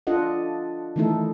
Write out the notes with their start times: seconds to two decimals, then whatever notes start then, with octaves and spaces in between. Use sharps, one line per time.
0.07 D4 F4 A4 D#5 F#5
0.96 D#3 E3 A3 D#4 E4 A4